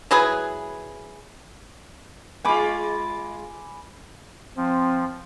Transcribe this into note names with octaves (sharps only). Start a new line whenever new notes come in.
E3 F#3 G#4 B4
G#3 F4 G#5 B5 D6
F3 C4